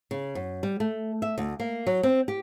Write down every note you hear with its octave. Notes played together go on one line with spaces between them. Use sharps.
C#3
F#2
G3
A3
E5
D2
A#3
F#3
C4
G4